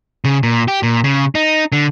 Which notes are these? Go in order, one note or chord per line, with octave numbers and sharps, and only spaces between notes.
C#3
A#2
G4
A#2
C#3
D#4
D3